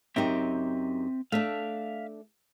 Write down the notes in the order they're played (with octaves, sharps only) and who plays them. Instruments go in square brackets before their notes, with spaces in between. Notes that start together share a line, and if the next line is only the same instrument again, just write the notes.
[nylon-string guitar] F#2 D#4 G4 [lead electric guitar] C4 E5
[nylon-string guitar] A3 D4 [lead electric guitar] E5 F5